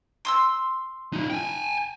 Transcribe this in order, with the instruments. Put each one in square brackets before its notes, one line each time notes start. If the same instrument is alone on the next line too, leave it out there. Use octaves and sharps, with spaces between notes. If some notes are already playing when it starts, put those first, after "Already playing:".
[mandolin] C6 D#6 E6
[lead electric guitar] D#4 F4
G5 G#5